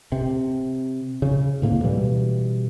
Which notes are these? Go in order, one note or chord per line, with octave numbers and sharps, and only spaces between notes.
C3
C#3
D2 A2 A#3
B2 E3 G3